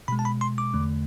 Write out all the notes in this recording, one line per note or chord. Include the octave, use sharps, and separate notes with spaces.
B2 G#3 B5
A5
B5
C6
D6
E2 D3 A3